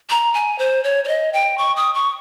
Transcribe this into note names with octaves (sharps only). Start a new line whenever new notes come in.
A#5
G#5
C5
C#5
C#5
D#5
G5
C#6
D#6
C#6